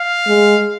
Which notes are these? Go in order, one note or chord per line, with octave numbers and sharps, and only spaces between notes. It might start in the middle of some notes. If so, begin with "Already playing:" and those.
Already playing: F5
G#3